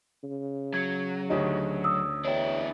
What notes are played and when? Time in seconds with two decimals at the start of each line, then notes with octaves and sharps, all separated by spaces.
0.23 C#3
0.74 F#3 G#6
1.30 D2 C#4 D#4 G4
1.84 D#6 E6
2.25 E2 D4 E4 C#5 G5